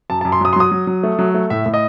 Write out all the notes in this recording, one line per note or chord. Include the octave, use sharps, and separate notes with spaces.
F#2 A5
A5
F#2
C6
F#3 D#6
C6
F#3 D#6
F#3
F#3
A3
F#3
A3
A2 E5
A2
D#5